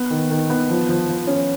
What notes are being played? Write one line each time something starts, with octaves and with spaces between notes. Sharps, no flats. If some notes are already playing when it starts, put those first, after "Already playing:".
Already playing: B3
D#3
D#3
B3
F3
F3
F3
C#4